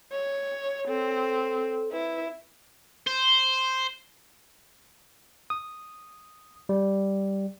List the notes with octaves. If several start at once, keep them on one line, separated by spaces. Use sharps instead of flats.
C#5
C4 A4
E4 B4
C5
D#6
G3